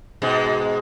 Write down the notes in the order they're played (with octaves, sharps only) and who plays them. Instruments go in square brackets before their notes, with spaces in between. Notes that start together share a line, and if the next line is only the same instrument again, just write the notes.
[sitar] G#2 B2 G#3